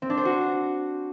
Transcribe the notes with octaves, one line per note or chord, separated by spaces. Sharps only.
C4
D4
C5
F#4